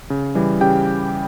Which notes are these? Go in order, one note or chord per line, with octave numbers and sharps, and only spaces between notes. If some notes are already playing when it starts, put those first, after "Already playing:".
C#3
E3 G3
C#3 G4 G5